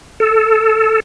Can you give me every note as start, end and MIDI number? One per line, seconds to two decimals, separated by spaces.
0.20 1.00 69